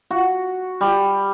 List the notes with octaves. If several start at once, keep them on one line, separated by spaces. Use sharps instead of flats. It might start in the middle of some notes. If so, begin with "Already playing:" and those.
F#4
G3